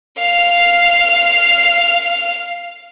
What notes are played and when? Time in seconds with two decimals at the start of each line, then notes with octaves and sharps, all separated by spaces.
0.19 F5 F7